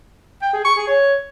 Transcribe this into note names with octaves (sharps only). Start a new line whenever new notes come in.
G5
G#4
C#6
G#4
C#5